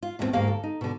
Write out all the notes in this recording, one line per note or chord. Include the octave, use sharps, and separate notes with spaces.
F4
D#2 A2 G3 B3 C4 F4
D2 G#2 A#3 G4 F5
A4
D#4
B2 D3